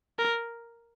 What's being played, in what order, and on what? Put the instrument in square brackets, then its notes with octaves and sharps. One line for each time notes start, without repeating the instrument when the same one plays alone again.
[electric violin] A#4